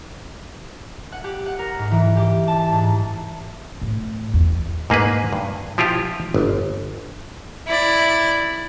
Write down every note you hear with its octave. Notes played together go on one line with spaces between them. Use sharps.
F#5
G4
F#5
A#4
G#2
E3
G4
A5
A5
G#2
A2
E2
G#2 A#3 G#4 B4
G2
F3 E4 F4 G4
G1
E4 D5